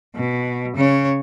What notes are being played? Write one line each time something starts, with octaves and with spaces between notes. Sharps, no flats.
B2
C#3 C#5